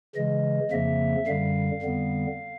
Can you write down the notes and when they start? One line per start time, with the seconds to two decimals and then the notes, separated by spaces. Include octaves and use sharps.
0.15 C#3 E3 G#3 D#5
0.71 F2 C#3 F3 A#3 E5
1.27 F#2 D3 G3 F5
1.82 F2 D3 G3 B3